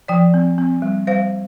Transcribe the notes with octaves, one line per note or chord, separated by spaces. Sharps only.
F3 D5 G5
C4
C4
G3
G3 C5 F5